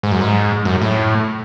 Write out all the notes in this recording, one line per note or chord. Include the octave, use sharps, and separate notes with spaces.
G#2
F#2
G#2
F#2
A2